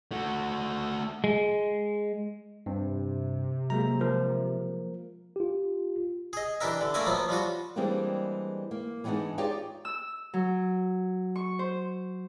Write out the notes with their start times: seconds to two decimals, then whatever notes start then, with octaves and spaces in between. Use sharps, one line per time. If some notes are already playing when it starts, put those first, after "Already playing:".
0.11 A3 F#4
1.24 G#3
2.66 G2 C3
3.70 F#3 G#3 A#3 A#5
4.01 F3 A#4
5.36 F4 G4
6.33 G#4 D#5
6.61 E3 D4 G4 A#4 E5
6.81 D3
6.94 A3 A#3 A#4 D5 E5 G#5
7.07 F3 F#3 A#3 B3
7.29 F3 G3 F4 F#4
7.76 E3 G3 G#3 A#3 C4 D4
8.71 A#3
9.04 E3 G3 G#3 B3 D4 D#4
9.38 D#4 F4 G4 G#4 C#5 D5
9.85 E6
10.34 F#3
11.36 C#6
11.59 C5